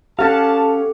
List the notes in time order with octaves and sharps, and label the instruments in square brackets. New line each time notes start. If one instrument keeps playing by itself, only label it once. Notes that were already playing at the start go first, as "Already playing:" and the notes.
[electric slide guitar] C#4 F5 [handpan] G4 F#5 [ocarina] A4 [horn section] A5